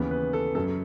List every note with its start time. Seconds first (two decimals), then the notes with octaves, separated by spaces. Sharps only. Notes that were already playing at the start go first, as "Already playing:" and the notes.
Already playing: D#2 C#3 E3 B3
0.11 B4
0.33 A4
0.55 F#2 C#3 F#3 A4